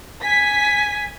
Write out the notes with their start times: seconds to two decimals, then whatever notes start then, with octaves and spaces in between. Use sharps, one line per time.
0.23 G#5 B6